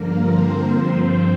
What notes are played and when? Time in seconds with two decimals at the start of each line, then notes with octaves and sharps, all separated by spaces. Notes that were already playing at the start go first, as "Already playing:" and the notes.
Already playing: G2 D3 F3 A#3 A#4
0.23 C4 C5
0.70 G2 F3